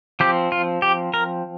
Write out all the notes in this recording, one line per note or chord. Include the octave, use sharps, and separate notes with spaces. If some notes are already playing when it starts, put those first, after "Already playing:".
F3 C4 G4
F4
G4
A#4